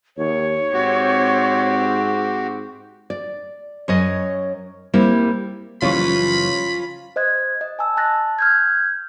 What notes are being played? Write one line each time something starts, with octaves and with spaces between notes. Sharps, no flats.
D#2 C#5
G#2 C4 F#4 G4
D5
F#2 C#5 D#5
G3 A#3 C4 E4
F#1 E3 F3 G3 C#4 F4 B5 C#6
C5 D#5 F#6 G#6
D#5
G#5 A5 E6
A5 F#6 A6 A#6
F6 G6 G#6